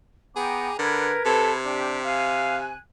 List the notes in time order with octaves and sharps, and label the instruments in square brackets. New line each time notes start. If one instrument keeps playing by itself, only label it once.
[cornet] B3 [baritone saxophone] G#4 [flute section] G5 A#5 D6
[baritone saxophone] D3 [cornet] A#4 [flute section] B4 G#6
[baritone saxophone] C3 [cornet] A4
[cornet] D4 [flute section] G4
[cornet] F5 [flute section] G#5 F#6